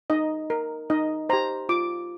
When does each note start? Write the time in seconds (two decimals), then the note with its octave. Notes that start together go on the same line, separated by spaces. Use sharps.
0.10 D#4 D#5
0.50 A#4
0.90 D#4 D#5
1.29 G4 C5 A#5
1.69 F4 D6